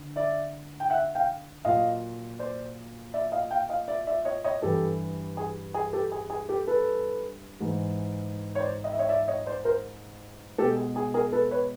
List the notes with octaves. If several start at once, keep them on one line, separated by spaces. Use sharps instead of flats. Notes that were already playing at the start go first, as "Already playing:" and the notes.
Already playing: D3
D5 E5
G5
E5 F#5
F5 G5
A#2 F#3 D#5 F5
C5 D5
D5 E5
D#5 F5
F5 G5
D#5 F5
D5 E5
D5 E5
C#5 D#5
C#5 D#5
G2 E3 G3 G4 A4
G#4
G#4
G4 A4
G#4
G#4
G4 A4
A4 B4
G#2 E3 G#3
C#5
C5 D5
D#5
E5
C#5 D#5
D5 E5
C#5 D#5
C5 D5
A#4 C5
B2 G#3 G4 A4
G#4
G#4
G#4 A#4
A4 B4
B4 C#5